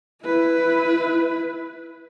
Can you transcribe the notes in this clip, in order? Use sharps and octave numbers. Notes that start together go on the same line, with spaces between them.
E4 B4